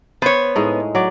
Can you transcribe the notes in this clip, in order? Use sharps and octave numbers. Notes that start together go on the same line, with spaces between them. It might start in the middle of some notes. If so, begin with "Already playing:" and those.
B3 C5 C#5
A2 G#3 D#4
F#3 D5